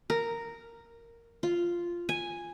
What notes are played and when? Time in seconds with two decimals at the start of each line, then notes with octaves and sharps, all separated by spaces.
0.10 A#4
1.43 F4
2.09 G#5